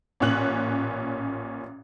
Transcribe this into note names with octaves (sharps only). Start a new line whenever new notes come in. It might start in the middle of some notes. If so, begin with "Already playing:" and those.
A1 A#2 C#4 F#6 F#7